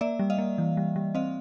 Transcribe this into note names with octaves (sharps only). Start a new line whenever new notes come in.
A#3 D5 E5
G3
D#5 F5
A#3
E3
G3
G3
C4 D#5 F5